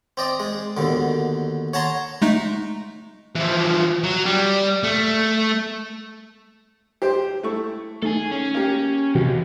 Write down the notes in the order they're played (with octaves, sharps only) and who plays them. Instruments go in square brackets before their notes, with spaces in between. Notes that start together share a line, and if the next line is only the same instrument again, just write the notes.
[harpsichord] C4 D5 D#5
G#3
D#2 B2 D3
C#5 F#5 A5 A#5 C6
[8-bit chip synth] G#3 A3 D#4
[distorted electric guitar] E3 F3
F#3
G3
A3
[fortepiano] G4 C5 G5
A3 E4 C#6
[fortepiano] D#3 [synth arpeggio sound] A3 [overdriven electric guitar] G#4 A4
[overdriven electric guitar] C#4
[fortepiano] A#3 G4
[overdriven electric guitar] D#2 [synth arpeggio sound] C3 E3 F#4